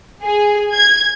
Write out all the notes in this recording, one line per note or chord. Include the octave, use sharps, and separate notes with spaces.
G#4
G#6